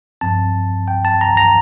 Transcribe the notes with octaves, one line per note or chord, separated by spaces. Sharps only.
G2 F3 C4 A5
G5
A5
A#5
A#5